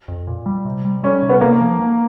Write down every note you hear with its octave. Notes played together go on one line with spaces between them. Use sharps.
F2
A#2
G3
C3
G3
G3 C#4
C3
B3
C3 A#3
F3
A#3